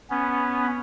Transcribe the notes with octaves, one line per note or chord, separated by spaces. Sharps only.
B3 C#4